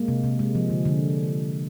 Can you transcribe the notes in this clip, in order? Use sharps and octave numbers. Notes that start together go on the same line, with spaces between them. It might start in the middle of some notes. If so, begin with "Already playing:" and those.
Already playing: G#3 A#3
C3
C3
G#3
F3
D3
D3